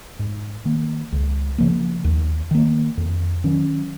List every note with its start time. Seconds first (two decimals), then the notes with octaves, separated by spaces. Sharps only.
0.19 G#2
0.65 D#3 A#3
1.12 C#2
1.58 C#3 F3 A#3
2.04 D#2
2.51 D#3 A#3
2.97 F2
3.44 D#3 F#3 C#4